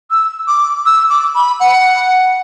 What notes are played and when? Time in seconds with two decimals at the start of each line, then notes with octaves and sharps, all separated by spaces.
0.11 E6
0.48 D6
0.86 E6
1.10 D6
1.35 B5
1.60 F#5